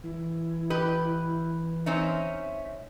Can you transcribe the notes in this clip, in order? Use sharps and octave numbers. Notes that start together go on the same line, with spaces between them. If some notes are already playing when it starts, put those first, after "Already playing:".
E3 E4
G4 B4 D#5
C4 C#4 D#4 E5